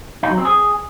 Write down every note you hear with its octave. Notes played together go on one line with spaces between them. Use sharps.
D#4
F#3
C4
G#4